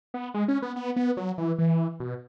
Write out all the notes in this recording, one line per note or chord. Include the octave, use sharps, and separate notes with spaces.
B3
G#3
C#4
B3
B3
B3
F#3
E3
E3
B2